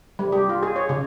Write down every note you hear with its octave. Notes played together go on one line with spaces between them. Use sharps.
G3
G4
F4
G#4
C#5
C#3